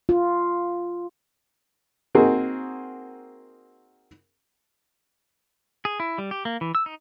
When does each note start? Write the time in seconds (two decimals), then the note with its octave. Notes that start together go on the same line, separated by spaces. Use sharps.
0.09 F4
2.15 A#3 C4 D#4 F#4 G#4
5.85 G#4
6.00 E4
6.18 G3
6.31 G4
6.45 A#3
6.61 E3
6.75 E6
6.86 D#4